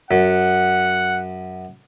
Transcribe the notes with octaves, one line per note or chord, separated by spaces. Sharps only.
F#2 F#5